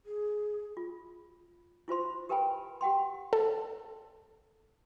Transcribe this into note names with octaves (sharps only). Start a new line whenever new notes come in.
G#4
F4
E4 F4 C5 C6
G4 A#4 B4 G5 G#5 B5
G4 F#5 G5 C6
A4